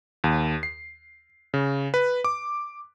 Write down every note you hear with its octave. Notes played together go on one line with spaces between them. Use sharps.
D#2
C7
C#3
B4
D6